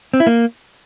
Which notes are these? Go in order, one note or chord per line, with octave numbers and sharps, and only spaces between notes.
C4
E4
A#3